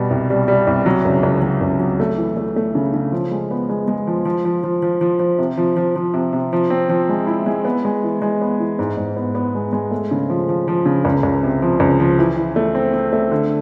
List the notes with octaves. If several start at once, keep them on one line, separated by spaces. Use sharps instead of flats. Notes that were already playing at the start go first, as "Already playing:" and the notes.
Already playing: B2 G3
C2
G3
G3
C2
F#3
C#2
C#2
F#3
C#2
F#3
A3
E3
A3
A3
C#3
C#3
F3
G#3
B3
G#3
G#3
F3
F3
F3
F3
F3
F3
F3
C3
F3
F3
F3
C3
C3
F3
C4
F3
G#3
E4
G#3
B3
G#3
E3
G#3
B3
E3
G#2
G#2
B3
B3
G#3
G#3
A3
C#3
F3
F3
F3
C#3
C#2
C#2
C3
F3
C#2
F3
E3
E3
A3
C4
C4
A3
D3